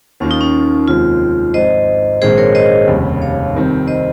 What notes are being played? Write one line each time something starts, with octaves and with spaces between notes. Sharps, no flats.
D#2 D#3 A#3 C#4 F4
D#4
C#4
F1 D#2 D#3 G#3 C4 F4
G#1 G#2 F3 C4 C5 D#5
A#1 G#2 D#3 G#3 C4 G#4 C5
A#4 C#5
C5 D#5
F1 D#2 C#3 G3
C#5 F5
F1 F2 D#3 G3 C4
C5 D#5